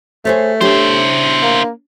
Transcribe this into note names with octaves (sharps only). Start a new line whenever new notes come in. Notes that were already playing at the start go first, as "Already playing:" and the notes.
A3 G#4 C5 C#5
D4 E4 G4 C5 C#5
A#3